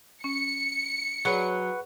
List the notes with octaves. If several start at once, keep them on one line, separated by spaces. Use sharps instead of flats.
C#4 C#7
F#3 G#4 B4 C#5 F#5 C#6